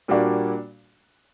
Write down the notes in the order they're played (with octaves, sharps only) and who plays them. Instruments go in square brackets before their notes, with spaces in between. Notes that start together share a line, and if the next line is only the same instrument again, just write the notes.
[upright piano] A#2 G3 A#3 D4 F#4